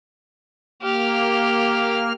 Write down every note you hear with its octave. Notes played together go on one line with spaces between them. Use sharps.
A#3 G4 F6